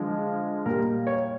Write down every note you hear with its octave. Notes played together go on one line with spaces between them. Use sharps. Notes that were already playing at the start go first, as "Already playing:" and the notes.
Already playing: D3 F3 G#3
A#2 G3 A#4
C#5